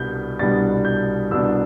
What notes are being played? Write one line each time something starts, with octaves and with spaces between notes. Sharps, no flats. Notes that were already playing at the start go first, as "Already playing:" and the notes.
Already playing: C2 B2 G3 B3 D4 G6
C2 B2 G3 B3 D4 A6
G6
C2 B2 G3 B3 D4 E6